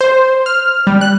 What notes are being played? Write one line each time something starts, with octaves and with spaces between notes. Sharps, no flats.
C5
F6
G3
F#6